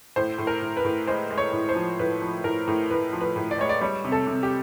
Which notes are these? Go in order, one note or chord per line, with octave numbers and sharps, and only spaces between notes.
A2 C5
A2
A#4
A2
B4
A2
G#3 C5
G#3
C#5
A2
C5
F3
A2 B4
F3
A2 A#4
A2
A2 B4
F3
B4
A2
D5
G#3 C#5
D5
G3 C#5
C3
A4
C3
G4